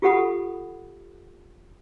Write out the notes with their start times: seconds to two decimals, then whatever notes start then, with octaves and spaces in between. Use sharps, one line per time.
0.02 F4 G4 A4 F#5 B5 D#6